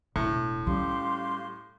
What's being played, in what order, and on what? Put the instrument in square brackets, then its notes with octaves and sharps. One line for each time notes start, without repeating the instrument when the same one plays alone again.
[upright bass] E1 [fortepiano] A2
[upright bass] G3 C#4 [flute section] G4 F5 C6